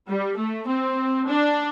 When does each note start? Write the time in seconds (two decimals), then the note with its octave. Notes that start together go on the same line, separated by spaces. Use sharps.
0.09 G3
0.38 A3
0.68 C4
1.27 D4